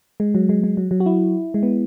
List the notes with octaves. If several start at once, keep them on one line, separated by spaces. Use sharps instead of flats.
G#3
F#3
G#3
G#3
F#3
F#3
F#4
E4
G#3
B3